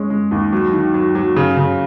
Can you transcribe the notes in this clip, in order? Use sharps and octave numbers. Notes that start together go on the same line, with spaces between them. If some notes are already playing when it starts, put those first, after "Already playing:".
Already playing: G#3 C#4
G#3
D#2
F#3
D#3
F#3
F#3
C#3
C#3